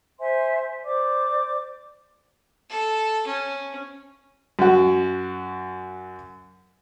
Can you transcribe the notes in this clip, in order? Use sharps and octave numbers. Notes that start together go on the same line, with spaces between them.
C5 E5 G#5 C6
C5 D5 D6
A4
C#4
F#2 F#4